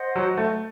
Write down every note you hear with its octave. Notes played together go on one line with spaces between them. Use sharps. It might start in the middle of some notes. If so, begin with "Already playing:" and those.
Already playing: C5 D#5 F#5
F#3
A3